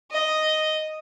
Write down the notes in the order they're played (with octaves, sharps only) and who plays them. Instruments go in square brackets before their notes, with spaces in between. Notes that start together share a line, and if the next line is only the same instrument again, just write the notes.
[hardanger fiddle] D#5